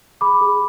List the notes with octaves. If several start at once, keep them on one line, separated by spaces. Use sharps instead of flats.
G#4 B5 D6
G#4